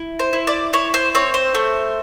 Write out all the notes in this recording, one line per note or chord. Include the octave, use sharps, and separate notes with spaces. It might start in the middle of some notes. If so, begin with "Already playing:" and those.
Already playing: E4
C5
E4
D5
E4 C#5
C5
C4 C#5
C5
A3